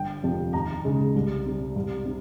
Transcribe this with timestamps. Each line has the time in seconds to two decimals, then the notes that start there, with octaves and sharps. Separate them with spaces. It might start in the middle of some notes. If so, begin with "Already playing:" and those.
Already playing: G1 G5
0.23 F2 C3 F3
0.53 D#2 A#5
0.85 C#3 G#3
1.15 C2
1.46 C3 G3
1.76 C2
2.05 C3